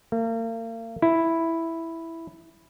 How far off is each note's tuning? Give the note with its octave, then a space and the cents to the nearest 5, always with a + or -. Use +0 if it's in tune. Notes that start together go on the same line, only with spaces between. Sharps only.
A#3 -40
E4 +0